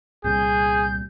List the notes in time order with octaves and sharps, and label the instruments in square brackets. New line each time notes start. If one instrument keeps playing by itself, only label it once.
[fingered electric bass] C2 A#2 G3 [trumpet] G#4 [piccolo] G6